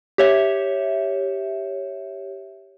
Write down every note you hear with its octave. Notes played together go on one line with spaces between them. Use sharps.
G4 C#5 E5